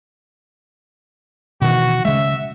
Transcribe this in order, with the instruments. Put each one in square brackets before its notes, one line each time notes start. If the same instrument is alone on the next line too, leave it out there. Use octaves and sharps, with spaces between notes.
[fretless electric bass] B2 D#3 E3 [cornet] F#4
[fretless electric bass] C#3 G#3 [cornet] E5